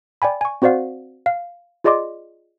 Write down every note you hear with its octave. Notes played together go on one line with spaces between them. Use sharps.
D5 G5 G#5 B5
G#5 C#6
C4 F#4 C5 D5 F5 F#5
F5
F4 G#4 D5 D#5 C6 D6